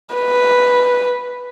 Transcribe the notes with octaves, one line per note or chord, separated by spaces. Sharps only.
B4